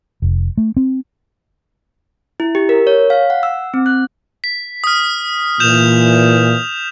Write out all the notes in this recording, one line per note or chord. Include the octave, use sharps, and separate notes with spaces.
F1
A3
C4
E4
G4
A#4
C#5
F5
F#5
E6
C4
F#6
B6
D#6 F6
A#2 E3 G6 E7 F7